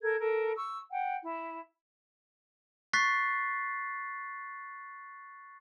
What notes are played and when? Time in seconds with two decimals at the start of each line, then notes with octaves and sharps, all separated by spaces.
0.02 A4 A#4 G#6
0.19 A4 A#4
0.56 C#6 E6
0.91 F#5 G5
1.23 E4
2.93 C#6 F#6 A6 B6 C7